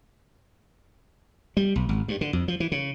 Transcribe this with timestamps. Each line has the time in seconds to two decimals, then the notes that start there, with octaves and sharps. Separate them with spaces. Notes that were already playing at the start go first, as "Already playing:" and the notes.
1.57 G3
1.76 B1
1.89 G#1
2.08 G2
2.21 D3
2.33 F2
2.48 F3
2.60 E3
2.72 C#3